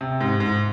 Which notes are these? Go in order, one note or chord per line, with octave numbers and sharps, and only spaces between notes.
C3
G#2
G#2